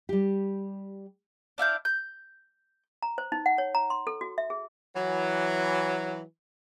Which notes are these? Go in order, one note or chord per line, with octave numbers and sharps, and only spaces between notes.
G3 G4
D4 E4 F5 G6
G6
A#5
C5
D#4
F#5
C#5
A#5
C6
A4
F#4
E5
G#4
E3 F#3